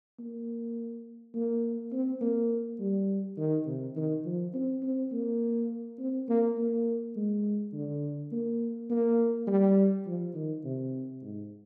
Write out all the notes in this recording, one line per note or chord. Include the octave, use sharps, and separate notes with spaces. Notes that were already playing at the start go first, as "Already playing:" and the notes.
A#3
A#3
C4
A#3
G3
D#3
C3
D#3
F3
C4
C4
A#3
C4
A#3
A#3
G#3
D3
A#3
A#3
G3
F3
D#3
C3
G#2